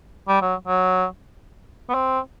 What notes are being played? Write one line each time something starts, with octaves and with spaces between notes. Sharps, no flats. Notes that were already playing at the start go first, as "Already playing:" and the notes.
G3
F#3
F#3
B3
C4